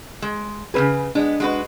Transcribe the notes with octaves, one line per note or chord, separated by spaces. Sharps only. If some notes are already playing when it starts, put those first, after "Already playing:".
G#3
C#3 C4 G#4 B4 G#5
G#3 B3 D4
G#3 F#4 B4